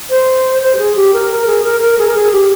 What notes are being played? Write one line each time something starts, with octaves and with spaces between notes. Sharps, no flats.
C5
C5
G4
G#4
G4
A#4
A#4
G#4
A#4
A#4
G#4
A#4
G#4
G4